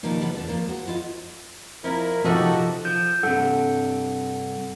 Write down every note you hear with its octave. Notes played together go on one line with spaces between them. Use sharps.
B2 D#3 F3 G3 A#3 D#4
C#3 E3 F3 G3 B3
E2 D4
F3 A#3
F#4 C5
E4 F4 D#5
F2 E4 A#4
C3 F3 D#4 F#4 G4 A4 D#5
F3 G6
G2 C3 A4 F#5